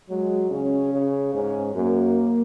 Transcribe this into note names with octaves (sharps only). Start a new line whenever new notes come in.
F#3 G#3
C#3 C#4
C#3
G#2 C#4
F#2 A#3